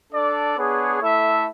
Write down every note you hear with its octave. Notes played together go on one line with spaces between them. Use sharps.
D4 A4 D5
B3 D4 G#4 C#5
A3 E4 A4 E5